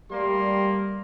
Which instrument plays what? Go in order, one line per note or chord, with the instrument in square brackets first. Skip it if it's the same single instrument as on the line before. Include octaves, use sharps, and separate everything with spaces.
[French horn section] G3 [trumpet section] A3 A#3 C6